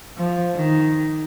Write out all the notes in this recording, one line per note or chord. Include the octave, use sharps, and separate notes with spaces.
F3
D#3